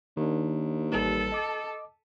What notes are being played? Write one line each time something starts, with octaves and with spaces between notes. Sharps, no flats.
D#2 D#3 D4
A1 G3 A4 B4
D#5 D6